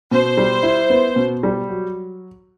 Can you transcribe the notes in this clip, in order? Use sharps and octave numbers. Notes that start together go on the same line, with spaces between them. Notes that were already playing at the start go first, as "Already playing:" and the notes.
B2 C5
G3
E4
B3
B2
G3
F#3